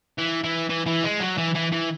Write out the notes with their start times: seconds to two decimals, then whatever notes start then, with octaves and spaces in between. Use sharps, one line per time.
0.18 E3
0.44 E3
0.70 E3
0.86 E3
1.04 G#3
1.20 F#3
1.38 E3
1.55 E3
1.72 E3